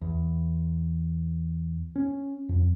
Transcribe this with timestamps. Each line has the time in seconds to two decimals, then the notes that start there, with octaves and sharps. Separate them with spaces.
0.02 E2
1.96 C#4
2.49 F2